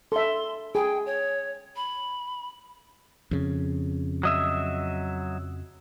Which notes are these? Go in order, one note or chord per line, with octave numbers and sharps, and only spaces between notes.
A4 E5 C6
G#4 G5
C#5
B5
F2 C#3
F#3 D#5 E5